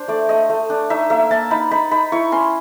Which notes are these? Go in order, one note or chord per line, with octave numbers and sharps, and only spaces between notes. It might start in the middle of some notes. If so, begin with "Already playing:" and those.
Already playing: D4 C5
A3 D5
A3 D#5
A3
D4
D#4 E5
A#3 E5
A#3 A5
D#4 B5
D#4 B5
D#4 B5
E4 C#6
C#4 C6